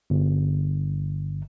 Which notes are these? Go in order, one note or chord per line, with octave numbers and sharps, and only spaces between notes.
G1